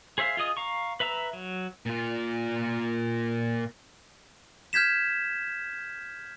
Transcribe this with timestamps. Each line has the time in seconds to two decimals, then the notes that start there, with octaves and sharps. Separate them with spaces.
0.18 G#4 C5 E5 F5
0.37 F4 G#4 D#5 D#6
0.57 F5 A#5 C#6
1.00 B4 E5 A#5 E6
1.33 F#3
1.86 A#2 F4
4.73 F6 G6 G#6 B6 E7